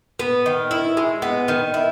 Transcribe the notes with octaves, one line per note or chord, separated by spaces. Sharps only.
B3
D#3
E4
G#3
B3
D#3
E4